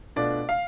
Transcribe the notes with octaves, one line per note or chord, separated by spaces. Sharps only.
B2 A3 D4 F4 D5
F5